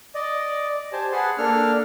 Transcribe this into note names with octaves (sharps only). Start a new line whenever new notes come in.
D5 D#5
G4 C5 G#5 A5
G#4 B4 F#5 G#5 A5 C6
A#3 D4 A4 F6